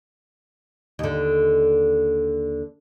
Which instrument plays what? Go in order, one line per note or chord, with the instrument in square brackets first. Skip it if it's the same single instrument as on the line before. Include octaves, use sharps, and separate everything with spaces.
[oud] D#2 D3